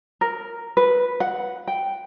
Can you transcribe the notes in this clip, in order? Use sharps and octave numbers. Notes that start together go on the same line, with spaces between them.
A#4
B4
F#5
G5